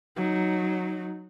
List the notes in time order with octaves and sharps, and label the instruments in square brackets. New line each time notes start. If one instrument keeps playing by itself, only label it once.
[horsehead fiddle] F#3 D#4